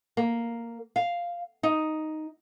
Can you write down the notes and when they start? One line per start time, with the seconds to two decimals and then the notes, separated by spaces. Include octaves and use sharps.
0.17 A#3
0.96 F5
1.63 D#4